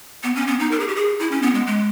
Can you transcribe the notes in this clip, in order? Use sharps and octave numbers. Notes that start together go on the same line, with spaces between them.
B3
C#4
B3
D#4
A#4
G#4
G4
G#4
E4
C#4
B3
G#3
G#3